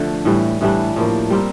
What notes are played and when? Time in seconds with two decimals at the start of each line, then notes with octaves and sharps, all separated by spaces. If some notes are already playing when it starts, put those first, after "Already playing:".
Already playing: D3 F3 A3
0.25 A2 E3 G3
0.61 A2 E3 G3 D4
0.96 A2 F3 A#3
1.30 G3 C4 G4 A#4